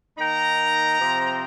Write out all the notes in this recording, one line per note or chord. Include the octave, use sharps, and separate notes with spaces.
D#3 A#3 D#4 G5 A#5
C3 F3 C4